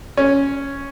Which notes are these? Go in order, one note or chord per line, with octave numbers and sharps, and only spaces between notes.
C#4